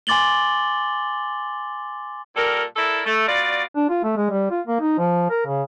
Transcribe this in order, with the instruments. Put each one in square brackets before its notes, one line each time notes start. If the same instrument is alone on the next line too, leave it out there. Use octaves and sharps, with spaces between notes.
[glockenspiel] G#5 C6 D6 A6 F#7 G7
[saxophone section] A#2 G3 A4 A#4
E4 A4 A#4 D5 E5
A3
B2 F4 F#4 D5
[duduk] D4
F4
A3
G#3
G3
F4
A#3
D#4
F3
A#4
C#3